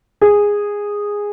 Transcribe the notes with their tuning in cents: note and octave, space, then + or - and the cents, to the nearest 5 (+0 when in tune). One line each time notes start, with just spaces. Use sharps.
G#4 -10